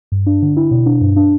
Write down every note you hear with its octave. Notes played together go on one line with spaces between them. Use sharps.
G2
D4
D3
E4
B2
D4
G2
D4